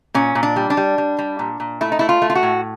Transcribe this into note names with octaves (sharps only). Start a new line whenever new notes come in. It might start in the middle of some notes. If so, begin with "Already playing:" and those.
A#2 C#4
A#2
D4
G3
D4
G3
G3
G3
A#2
A#2
A3 E4
D#4
A3 E4
F4
A3
F4
F#4
A2